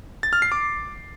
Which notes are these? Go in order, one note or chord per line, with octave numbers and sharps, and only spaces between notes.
A6
F6
C7
D6